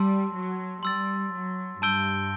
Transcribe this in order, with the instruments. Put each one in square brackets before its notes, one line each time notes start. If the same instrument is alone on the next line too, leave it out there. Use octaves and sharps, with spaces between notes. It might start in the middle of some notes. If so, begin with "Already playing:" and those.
Already playing: [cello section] G3 [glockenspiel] A5 C6 E6
[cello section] F#3
[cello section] G3 [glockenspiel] C6 E6 A6
[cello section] F#3
[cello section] G2 [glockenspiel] A5 E6 G6 D7 G7